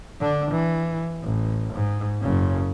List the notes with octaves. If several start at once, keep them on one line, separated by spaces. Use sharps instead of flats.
D3 D4
E3
A1
G#2
F#1 C#3